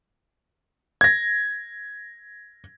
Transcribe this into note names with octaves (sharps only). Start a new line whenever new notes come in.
G#6 A#6